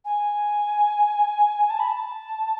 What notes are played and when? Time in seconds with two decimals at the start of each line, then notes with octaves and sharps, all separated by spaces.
0.05 G#5
1.70 A5
1.79 B5
1.88 A5